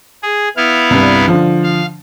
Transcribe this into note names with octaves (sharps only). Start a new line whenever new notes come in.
G#4
B3 E4 F5
C2 G2
D3 F3
F5